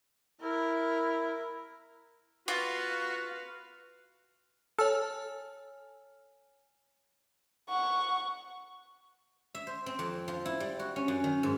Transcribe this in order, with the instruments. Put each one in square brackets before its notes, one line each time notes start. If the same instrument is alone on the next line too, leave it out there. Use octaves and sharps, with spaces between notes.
[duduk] E4 [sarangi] A#4
[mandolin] F4 [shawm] F#4 [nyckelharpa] B4 F5
[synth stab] A4 [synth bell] C#5 G#5 F6
[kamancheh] F#5 C#6
[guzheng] E5
C5
C4
F2
F3
E4
G3
F#4
C#4
F#2
D#3
G#2